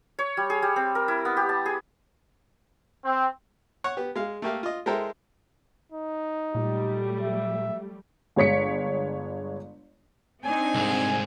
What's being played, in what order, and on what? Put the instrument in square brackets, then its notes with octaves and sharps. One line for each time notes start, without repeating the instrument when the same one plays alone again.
[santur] C#5
G3
G#4
G3
C4
A#4
E4
B3
G4
A5
G#4
[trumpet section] C4
[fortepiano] C#5 F#5 C#6
B3 G4
G#3 F5
A3 A#3 G4 F5
F4 D#5
G#3 E4 A4 A#4 C5 G5
[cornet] D#4
[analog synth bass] A#2 [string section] F#3 G3 A3
[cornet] E5
[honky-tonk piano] G1 G#3 C#5 B6 C#7
[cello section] C4 D4 D#4 [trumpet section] G#5
[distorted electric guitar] C2 G#2